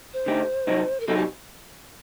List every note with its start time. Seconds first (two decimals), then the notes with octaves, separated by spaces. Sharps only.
0.13 C5
0.26 D3 A3 D#4 G4
0.67 C2 C3 F#3 C4 D#4
1.00 A#4
1.07 C3 F#3 C4 D#4 A4
1.18 G4